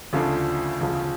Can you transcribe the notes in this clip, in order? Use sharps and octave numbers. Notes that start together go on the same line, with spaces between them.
D2 C#3 F3 A3 D4
E1 D2 C#3 F3